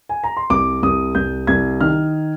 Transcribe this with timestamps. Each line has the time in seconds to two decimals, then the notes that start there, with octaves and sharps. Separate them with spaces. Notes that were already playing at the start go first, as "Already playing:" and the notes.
0.09 G#5
0.24 A#5
0.37 C6
0.50 C2 D6
0.83 C2 D#6
1.15 C2 G6
1.47 C2 G#6
1.81 D#3 F6